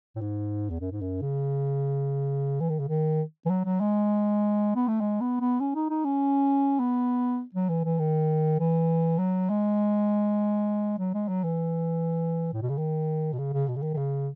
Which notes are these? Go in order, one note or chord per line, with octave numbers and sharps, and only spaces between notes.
A2
G#2
E2
F#2
G#2
F#2
C#3
E3
D#3
C#3
D#3
E3
F#3
F#3
G#3
B3
A3
G#3
B3
B3
C#4
D#4
D#4
C#4
B3
F#3
E3
E3
D#3
E3
F#3
G#3
F#3
G#3
F#3
E3
A2
B2
C#3
D#3
B2
C#3
C#3
B2
C#3
D#3
D#3
C#3